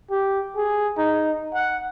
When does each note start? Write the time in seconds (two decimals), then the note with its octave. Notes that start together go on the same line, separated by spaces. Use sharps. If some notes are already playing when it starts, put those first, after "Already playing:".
0.10 G4
0.57 G#4
0.97 D#4
1.54 F#5